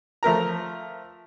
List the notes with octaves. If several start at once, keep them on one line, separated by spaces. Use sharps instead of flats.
F3 A3 A#4 A#5